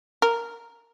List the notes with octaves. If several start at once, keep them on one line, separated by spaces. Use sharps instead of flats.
A#4